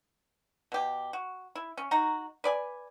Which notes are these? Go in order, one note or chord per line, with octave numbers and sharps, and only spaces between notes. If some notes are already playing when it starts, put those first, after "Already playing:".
B2 G4
F#4
E4
C#4
D#4 F#4 A#5
B4 D5 G#5